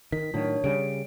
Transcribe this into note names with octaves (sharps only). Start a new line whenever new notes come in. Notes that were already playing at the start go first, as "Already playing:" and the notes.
D#3 B6
A2 D#3 F#3 D4 C#5
C#3 G3 D7